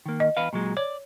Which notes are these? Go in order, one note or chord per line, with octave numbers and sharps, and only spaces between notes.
D#3 A#3
D#5
E2 B4 F5
A#2 F#3 G#3
C#5 D5